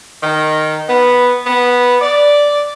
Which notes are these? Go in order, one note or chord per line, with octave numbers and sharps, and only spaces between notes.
D#3
B3
B3
D5